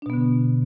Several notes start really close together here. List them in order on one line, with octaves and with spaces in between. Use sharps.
D4 B2 B3 D3